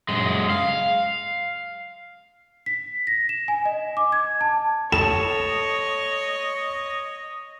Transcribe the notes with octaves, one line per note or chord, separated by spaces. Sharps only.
F#2 G#3
F5
B6
A#6
E7
G#5
D#5
D6
G#6
A5
A4 C#5 D#5 E7